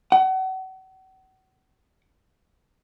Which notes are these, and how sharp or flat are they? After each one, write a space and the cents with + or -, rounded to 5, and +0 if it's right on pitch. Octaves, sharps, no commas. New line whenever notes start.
F#5 +35